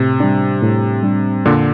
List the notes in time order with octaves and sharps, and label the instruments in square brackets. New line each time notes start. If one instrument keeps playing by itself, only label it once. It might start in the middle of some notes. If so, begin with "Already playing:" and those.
Already playing: [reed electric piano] A2 [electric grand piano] C3
[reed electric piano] G3 D4
A2
G3 D4
[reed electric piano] F2 [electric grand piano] A#2 D3